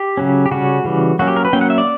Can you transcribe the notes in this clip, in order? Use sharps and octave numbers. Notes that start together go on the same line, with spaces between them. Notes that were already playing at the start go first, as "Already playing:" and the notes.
Already playing: G4
C#3 F#3 C#4
G4
C#3 G3 C#4 F#4
C#3 E3 G3
F#3 A#3 C#4 F#4
G4
A#4
B4
F#3 A#3 C#4 G5
F#5
E5
D5